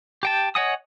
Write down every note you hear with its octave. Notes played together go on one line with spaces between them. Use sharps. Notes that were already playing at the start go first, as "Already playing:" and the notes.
G4 G5 A5
C#5 D#5 F#5 G#5 D#6